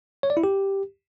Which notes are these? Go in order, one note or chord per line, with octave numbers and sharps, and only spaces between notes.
C#5
D5
E4
G4